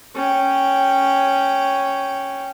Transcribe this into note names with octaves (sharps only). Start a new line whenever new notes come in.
C#4 G5